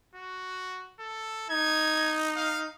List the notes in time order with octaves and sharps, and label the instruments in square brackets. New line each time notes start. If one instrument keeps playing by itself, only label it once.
[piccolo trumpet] F#4
A4
[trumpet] D#4 [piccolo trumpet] G#6
[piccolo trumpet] F5